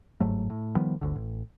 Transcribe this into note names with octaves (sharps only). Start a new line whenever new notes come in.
G1 G#2 F#3 A3
A2
D#3 F3 G3 B3
G1 D2 D3
A1